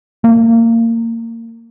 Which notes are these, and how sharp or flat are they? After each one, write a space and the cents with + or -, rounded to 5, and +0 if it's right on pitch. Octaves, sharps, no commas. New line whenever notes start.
A#3 -25